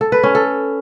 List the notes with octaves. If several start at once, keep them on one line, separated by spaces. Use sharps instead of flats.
A4
B4
C#4
A4